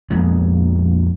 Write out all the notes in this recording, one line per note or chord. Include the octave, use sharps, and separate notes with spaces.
A#1 F2 G#3 B3